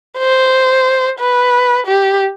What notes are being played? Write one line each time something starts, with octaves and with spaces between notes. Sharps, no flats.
C5
B4
G4